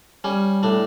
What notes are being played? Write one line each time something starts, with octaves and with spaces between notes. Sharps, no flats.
G3 C#4
A2 D4